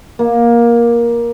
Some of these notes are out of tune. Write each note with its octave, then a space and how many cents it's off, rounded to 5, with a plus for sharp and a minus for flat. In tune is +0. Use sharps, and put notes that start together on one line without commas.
A#3 +15